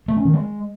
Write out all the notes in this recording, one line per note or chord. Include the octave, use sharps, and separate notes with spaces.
A3
C#4
D#3
G#3